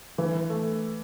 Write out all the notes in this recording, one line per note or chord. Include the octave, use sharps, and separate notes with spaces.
E3
A3